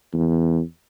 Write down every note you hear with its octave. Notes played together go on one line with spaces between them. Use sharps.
E2